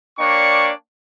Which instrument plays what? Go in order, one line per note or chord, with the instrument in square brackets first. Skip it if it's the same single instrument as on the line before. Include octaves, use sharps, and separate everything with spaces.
[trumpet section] A#3 D4 C#5 D5 G5 C#6